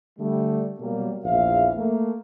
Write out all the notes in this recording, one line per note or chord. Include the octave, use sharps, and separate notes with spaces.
D3 G3 A3
B2 F#3 G3 A#3
A#1 E2 E3 E5 F5
A3 A#3